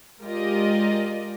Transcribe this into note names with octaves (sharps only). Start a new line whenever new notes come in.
G#3 F4 G4 A#4 D5 D#5